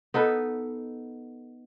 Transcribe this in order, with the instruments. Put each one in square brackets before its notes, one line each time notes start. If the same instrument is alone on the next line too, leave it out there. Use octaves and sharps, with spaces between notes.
[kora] B3 D#4 A4 B4